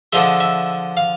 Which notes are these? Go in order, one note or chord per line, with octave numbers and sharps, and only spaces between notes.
D3 F3 G#3 E5
E5
F5